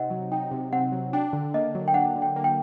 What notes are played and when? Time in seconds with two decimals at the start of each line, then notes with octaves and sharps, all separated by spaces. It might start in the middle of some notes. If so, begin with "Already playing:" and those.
Already playing: C3 C4 D#4 D#5 F#5
0.10 F#3
0.32 D#4 G5
0.51 C3
0.73 C4 F#5
0.92 F#3
1.13 D4 G5
1.33 D3
1.54 A#3 D#5
1.75 F#3
1.88 G5
1.94 D4 F#5
2.16 D3
2.22 G5
2.36 A#3
2.44 G5